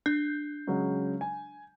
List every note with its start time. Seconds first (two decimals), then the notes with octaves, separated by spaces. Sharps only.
0.06 D4 G6
0.67 C#3 F#3 G#3
1.21 G#5